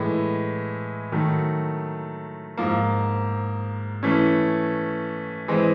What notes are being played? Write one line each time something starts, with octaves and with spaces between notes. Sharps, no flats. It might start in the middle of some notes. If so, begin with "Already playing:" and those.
Already playing: A2 E3 G#3
D#3 F#3 A3
G#2 F3 A#3
E3 A3 C#4
E3 G#3 C4